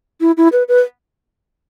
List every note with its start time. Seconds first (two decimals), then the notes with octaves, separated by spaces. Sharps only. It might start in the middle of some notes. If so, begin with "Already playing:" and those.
0.21 E4
0.37 E4
0.52 B4
0.68 B4